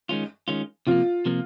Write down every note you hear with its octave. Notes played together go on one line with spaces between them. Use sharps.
D#3 G#3 C#4 F4
D#3 G#3 C#4 F4
C3 F3 A#3 F4
C3 F3 A#3